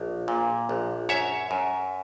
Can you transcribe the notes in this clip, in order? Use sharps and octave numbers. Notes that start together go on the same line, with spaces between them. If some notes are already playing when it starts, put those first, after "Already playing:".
Already playing: A#1
A#2
A#1
F#2 C#5 E5
F#2